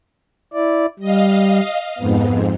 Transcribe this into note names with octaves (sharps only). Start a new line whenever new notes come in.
E4 D5
G3 D#5 F5
F2 G#2 B3